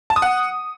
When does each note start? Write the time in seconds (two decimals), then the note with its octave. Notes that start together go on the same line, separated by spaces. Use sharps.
0.10 A5
0.16 D#6
0.22 F#5